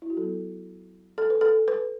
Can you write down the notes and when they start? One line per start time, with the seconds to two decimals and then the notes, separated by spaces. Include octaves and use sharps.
0.02 E4
0.10 F#4
0.17 F#3 B3 A4
1.18 A4
1.30 B4
1.41 A4
1.68 B4